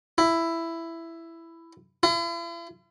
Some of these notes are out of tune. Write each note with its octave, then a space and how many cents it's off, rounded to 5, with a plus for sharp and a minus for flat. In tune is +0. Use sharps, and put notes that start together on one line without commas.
E4 +10
E4 +45